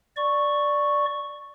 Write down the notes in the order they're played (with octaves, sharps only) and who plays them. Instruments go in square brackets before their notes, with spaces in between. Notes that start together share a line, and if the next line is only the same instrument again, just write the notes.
[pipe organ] D5 C#6